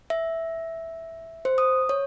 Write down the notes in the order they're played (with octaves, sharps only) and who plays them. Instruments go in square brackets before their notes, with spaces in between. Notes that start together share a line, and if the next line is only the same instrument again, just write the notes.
[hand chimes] E5
C5
D#6
C#5